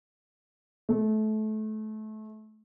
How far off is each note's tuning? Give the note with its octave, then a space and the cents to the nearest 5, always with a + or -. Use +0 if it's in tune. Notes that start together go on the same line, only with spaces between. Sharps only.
A3 -25